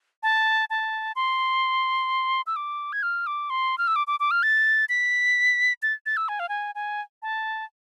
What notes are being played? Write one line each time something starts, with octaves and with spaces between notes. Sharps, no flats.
A5
A5
C6
E6
D6
G#6
F6
D6
C6
F6
E6
D6
D6
D6
F6
A6
B6
A6
A6
E6
G#5
F5
G#5
G#5
A5